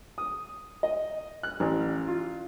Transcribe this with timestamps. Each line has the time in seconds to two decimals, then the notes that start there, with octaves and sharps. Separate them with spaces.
0.18 D#6
0.83 D#5
1.43 F#6
1.60 A1
2.07 F4